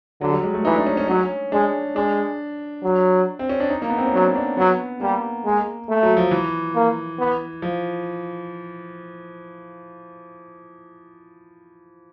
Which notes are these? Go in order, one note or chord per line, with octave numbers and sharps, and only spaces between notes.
D3 F#3
G3
G#3
A3
E3 D#4
D4
C#4
C#4
F#3 C#4
G#3 D4
G#3 D4
F#3
C4
C#4
D4
D#4
A#3
B3
C4
C#4
F#3 D4
D4
F#3 B3
G3 A#3
G#3
A3
F#3
F3
E3
A#3
B3
F3